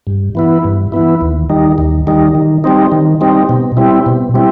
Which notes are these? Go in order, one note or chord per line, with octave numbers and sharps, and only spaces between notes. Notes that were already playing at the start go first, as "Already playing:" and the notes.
G2
E3 B3 E4
G2
E3 B3 E4
D#2
D#3 G3 D#4
D#2
D#3 G3 D#4
D#3
G3 C4 D#4
D#3
G3 C4 D#4
B2
G3 C4 E4
B2
G3 C4 E4